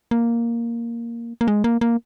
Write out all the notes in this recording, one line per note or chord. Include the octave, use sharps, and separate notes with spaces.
A#3
A#3
G#3
A#3
A#3